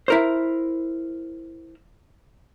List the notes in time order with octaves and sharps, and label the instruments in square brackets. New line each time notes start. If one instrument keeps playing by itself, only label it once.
[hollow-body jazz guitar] E4 A#4 C5